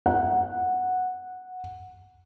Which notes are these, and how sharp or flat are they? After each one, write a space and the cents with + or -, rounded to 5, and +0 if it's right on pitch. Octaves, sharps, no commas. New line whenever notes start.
F#5 -10